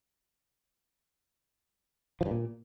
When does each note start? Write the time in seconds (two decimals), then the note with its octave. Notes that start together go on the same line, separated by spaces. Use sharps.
2.21 F3
2.26 G2
2.31 A#2